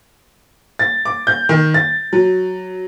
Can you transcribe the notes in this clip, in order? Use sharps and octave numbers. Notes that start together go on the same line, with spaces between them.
A6
D6
G6
D#3
A6
F#3